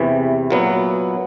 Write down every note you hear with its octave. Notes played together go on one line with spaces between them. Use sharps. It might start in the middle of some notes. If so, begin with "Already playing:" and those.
Already playing: E2 C3 E3
A#2 F#3 B3 E4